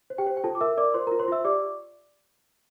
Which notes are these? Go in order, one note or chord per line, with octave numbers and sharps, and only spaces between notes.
C5
G4 G5
C5
G5
F4 A4 A5
D6
A#4 E5 E6
A#4 D5 D6
F4 C5 C6
F4 A#4 A#5
C5 C6
F4 E5 E6
G4 D5 D6